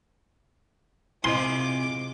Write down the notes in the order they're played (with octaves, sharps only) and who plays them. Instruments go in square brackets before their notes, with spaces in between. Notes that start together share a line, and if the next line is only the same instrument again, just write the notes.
[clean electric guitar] C3 F4 G#4 [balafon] E4 C5 D#5 [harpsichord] C6 [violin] D6